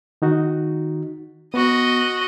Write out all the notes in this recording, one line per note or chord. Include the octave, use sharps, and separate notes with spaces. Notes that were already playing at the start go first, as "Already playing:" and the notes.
D#3 D#4 F#4
B3 F#4 D#5